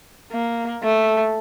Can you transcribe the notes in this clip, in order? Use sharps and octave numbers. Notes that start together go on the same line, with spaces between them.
A#3
A3